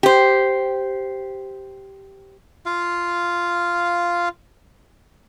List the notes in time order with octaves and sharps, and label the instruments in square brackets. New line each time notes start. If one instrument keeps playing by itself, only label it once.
[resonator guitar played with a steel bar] G4 C5
[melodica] F4 F5